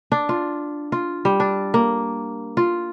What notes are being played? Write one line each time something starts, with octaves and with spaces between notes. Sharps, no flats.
D4
F4
F4
G3
D4
A#3
F4